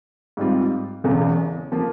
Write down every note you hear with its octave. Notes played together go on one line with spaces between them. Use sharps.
G#2 G3 C4 F4
E1 E2 C#3 E3
F3 A#3 F4